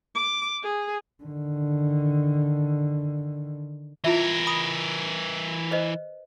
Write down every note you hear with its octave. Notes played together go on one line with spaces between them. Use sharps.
D6
G#4
D3 D#3
E3 E4 F4 A#4 E5
B5 D#6
B4 C5 D#5